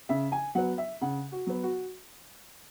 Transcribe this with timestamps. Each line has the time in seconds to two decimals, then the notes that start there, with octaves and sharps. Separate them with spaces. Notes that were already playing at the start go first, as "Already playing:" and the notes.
0.09 C#3 E5
0.32 G#5
0.55 F#3 B3 F#5
0.78 E5
1.01 C#3 F#5
1.32 F#4
1.47 F#3 B3
1.63 F#4